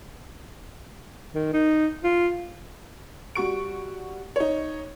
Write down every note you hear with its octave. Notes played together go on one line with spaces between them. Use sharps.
D#3
D#4
F4
G3 F#4 C#6 D7
D#4 C#5